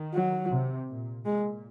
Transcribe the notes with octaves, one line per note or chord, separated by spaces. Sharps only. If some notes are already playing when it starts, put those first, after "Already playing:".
Already playing: D#3
F#3
C3
A#2
A#2 G#3